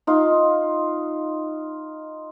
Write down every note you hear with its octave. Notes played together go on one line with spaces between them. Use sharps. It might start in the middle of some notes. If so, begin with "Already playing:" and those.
D#4 F4